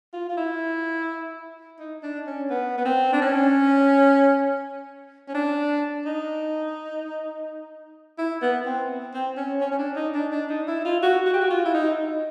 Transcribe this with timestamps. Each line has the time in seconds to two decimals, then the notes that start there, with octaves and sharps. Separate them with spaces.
0.13 F4
0.29 F4
0.37 E4
1.79 D#4
2.03 D4
2.27 C#4
2.50 B3
2.78 B3
2.85 C4
3.13 D4
3.21 C#4
5.28 C#4
5.35 D4
6.06 D#4
8.18 E4
8.42 B3
8.66 C4
9.14 C4
9.37 C#4
9.61 C#4
9.71 C#4
9.79 D4
9.96 D#4
10.14 D4
10.32 D4
10.50 D#4
10.67 E4
10.85 F4
11.03 F#4
11.26 F#4
11.34 G4
11.41 F#4
11.50 F4
11.65 E4
11.74 D#4